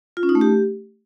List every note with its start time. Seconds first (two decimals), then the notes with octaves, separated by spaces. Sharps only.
0.17 F4
0.23 C#4
0.29 D#4
0.35 A3
0.41 G4